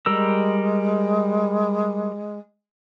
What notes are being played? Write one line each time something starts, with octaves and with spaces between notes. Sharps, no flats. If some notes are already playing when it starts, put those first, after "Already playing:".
G3 G#3 A#4 E6